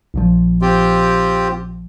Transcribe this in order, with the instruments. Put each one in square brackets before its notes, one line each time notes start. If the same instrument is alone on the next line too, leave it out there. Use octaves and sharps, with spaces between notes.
[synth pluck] A#1 A#2 F3
[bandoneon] C4 F4 G4